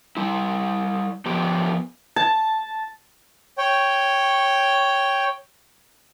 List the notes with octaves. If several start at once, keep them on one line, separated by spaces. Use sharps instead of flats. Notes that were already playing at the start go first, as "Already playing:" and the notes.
G3 E4
F3 B3 G4
A5
C#5 G5